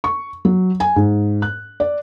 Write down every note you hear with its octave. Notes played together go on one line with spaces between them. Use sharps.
C#6
F#3
G#5
G#2
F#6
D5